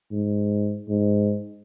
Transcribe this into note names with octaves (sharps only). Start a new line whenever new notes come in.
G#2
G#2